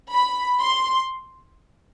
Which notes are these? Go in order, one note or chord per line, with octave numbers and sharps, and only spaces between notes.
B5
C6